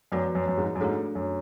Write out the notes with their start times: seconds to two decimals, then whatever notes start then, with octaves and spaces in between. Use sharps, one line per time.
0.12 F#2 F3 B3 F#4 B4 D5
0.35 F#2
0.48 F#2
0.58 G#2
0.75 F#2
0.80 G#2 A3 D4 F#4 A4
1.15 F#2